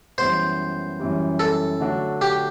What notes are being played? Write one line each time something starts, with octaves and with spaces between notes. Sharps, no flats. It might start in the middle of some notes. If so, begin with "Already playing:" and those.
F#2 E3 G3 B3 C5
F#2 E3 G3
A4
D3 F#3 A3 D4 F#4
G4